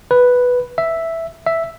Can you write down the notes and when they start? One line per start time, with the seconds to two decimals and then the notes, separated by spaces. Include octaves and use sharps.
0.11 B4
0.78 E5
1.46 E5